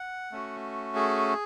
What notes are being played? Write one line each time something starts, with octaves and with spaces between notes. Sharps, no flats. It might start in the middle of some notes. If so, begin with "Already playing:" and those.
Already playing: F#5
A3 C#4 F#4
G#4